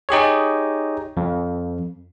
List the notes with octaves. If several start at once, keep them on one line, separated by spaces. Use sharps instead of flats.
D#4 G4 G#4 C#5
F2